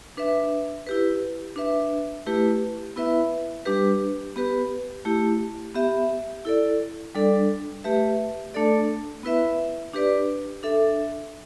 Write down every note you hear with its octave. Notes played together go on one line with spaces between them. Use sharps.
D4 B4 E5
E4 G4 B4
D4 B4 E5
A3 E4 G4 B4
B3 E4 B4 E5
G3 D4 G4 B4
B3 G4 B4
A3 E4 G4
B3 G4 E5
E4 A4 D5
G3 D4 A4 D5
A3 G4 B4 E5
A3 D4 A4 D5
B3 E4 B4 E5
D4 G4 B4 D5
D4 A4 E5